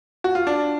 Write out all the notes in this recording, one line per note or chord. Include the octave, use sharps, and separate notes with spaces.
F#4
F4
D4